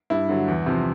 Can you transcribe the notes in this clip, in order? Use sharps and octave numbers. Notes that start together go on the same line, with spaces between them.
G2 E4
D3 F#3
E2
C3 F3